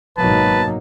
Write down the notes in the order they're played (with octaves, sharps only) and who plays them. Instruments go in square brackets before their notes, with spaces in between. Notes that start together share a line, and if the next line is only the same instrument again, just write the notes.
[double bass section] G#1 B2 A#3 [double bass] F#3 D#4 [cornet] B4 [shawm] A5